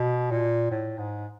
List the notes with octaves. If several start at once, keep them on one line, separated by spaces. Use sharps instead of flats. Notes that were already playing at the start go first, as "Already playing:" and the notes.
Already playing: B2
A#2
A2
G#2